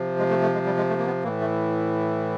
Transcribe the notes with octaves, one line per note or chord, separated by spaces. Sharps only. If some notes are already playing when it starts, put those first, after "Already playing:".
Already playing: C3 F3
G#3
A3
A3
G#3
G3
G#3
A3
A#3
B3
A2 E3 A#3
A3